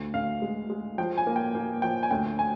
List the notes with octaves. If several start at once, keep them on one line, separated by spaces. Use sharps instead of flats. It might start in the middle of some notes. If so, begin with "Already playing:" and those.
Already playing: D2
D2 F5
G#3
G#3
F3 G5
G#5
A#3
G5
A#3
F3 G5
G#5
D2 G5
G#5